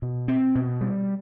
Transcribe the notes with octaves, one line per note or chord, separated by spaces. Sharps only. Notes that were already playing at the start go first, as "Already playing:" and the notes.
B2
C4
B2
G3